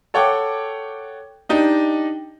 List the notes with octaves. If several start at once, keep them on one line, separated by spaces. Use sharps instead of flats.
A4 C#5 F#5 G5 D6
D4 D#4 G4 D#5